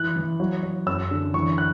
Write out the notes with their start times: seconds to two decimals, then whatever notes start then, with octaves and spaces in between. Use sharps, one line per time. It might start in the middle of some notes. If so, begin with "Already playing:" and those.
Already playing: E3 F#6
0.16 E3
0.40 F#3
0.63 F#3
0.86 F#2 E6
1.11 D3
1.34 E3 C#6
1.58 F#6